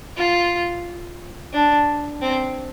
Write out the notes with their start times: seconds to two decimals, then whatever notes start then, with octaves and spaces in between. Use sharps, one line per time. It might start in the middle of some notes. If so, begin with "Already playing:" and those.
0.17 F4
1.53 D4
2.22 C4